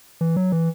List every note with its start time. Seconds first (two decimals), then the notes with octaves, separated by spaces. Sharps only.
0.21 E3
0.36 F#3
0.52 E3